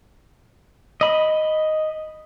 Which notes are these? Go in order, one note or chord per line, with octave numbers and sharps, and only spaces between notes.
D#5 B5